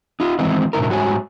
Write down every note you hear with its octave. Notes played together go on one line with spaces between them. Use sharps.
D#4 F4
D#3 E3 G#3 C4 D#4 E4
G#2 B2 D3 E4 A#4
G#2 G3 F#4 C#5 G#5